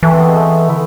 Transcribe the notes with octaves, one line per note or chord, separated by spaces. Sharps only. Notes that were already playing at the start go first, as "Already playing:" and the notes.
E3 A3
C4
B3
G#3
A3
D3 E4